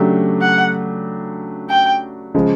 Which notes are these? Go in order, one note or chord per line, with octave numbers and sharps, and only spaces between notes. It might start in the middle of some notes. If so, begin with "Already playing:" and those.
Already playing: C#3 F#3 A3 D4 G4
F#5
G5
C#3 F3 G#3